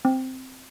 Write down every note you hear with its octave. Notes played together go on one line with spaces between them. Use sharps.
C4